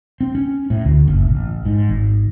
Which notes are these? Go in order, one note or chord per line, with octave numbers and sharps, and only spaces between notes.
C4
C#4
A2
D2
F#1
A1
G#2
G#1